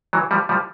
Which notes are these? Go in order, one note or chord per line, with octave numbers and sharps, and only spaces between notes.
E3 F#3
F3 G3
F3 G3